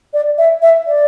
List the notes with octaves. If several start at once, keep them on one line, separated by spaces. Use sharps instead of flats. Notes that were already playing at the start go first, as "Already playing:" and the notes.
D5
E5
E5
D5